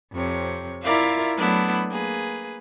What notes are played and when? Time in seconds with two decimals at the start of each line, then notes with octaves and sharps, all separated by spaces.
0.13 F2 C3 C#5
0.83 E4 F4 A#4 D5 E5 F5
1.36 F#3 A3 B3 D4 E4
1.88 A#3 G#4 B4